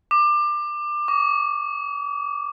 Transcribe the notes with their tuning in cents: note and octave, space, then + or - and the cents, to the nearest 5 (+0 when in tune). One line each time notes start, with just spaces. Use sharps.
D6 +25
D6 -45